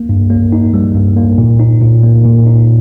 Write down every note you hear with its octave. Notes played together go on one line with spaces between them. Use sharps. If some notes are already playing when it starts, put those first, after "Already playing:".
Already playing: A#3
G2
A#3
D#4
G3
G2
A#3
A#2
D#4
A#2
A#3
A#2
D#4